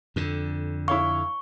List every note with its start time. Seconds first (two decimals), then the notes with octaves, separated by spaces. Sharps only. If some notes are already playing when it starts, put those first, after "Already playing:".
0.16 F2 D3
0.88 E4 C#5 F5 C#6